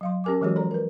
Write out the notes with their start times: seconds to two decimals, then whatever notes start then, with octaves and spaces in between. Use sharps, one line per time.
0.01 F#3 F5 C6
0.24 C#4 G4 A#4 G#5 D6
0.41 E3 F#3 G#3 F#4 G#4 C#5
0.56 F3 A4 D5 A#5
0.71 A#4 B4